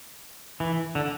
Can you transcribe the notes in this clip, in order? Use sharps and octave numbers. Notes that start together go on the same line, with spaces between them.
E3
D3